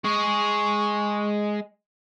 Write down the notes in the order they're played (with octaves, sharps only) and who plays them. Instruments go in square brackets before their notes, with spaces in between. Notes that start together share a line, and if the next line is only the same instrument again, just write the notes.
[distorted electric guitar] G#3 G#4 [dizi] C#6